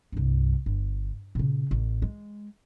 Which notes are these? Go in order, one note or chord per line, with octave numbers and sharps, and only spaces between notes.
C2 G2
G1
A#2 C#3
A1
G#3